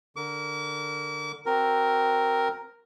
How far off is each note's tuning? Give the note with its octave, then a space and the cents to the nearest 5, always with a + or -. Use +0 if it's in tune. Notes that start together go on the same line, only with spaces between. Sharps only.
D3 +0 A#4 +0 D6 -35
C4 +0 F#4 +0 A#4 +0